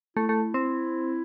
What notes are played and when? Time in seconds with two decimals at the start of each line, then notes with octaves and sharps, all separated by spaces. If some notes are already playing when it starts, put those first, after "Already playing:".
0.17 A3 E4
0.29 A3
0.54 C4